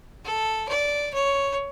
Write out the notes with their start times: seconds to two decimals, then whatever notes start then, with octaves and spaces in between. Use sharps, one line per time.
0.25 A4
0.69 D5
1.14 C#5